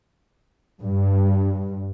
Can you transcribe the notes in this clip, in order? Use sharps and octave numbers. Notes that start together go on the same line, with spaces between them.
G2